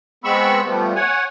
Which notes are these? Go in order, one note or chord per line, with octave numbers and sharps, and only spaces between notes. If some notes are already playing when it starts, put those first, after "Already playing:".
G#3 B3 C4 B5 C#6 E6
F3 G3 A3 B3
C#5 F#5 G#5